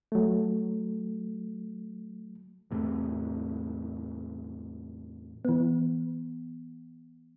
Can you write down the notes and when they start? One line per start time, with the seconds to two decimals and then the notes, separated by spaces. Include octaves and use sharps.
0.12 F#3 A3
2.71 E2 A2 C3
5.45 E3 B3